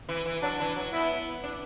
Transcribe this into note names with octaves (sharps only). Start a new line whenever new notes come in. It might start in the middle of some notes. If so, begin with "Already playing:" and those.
E3
E3
F#3 D4
E3
F#3
B3 E4
D4